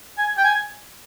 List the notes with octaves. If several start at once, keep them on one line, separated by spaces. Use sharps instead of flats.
G#5
G5
G#5